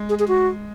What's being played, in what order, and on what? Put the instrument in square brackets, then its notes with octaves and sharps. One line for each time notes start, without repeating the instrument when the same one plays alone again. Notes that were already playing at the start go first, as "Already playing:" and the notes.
Already playing: [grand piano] G#3
[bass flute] G#4
G#4
F#4